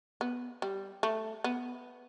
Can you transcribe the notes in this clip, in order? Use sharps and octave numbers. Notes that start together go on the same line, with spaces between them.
B3
G3
A3
B3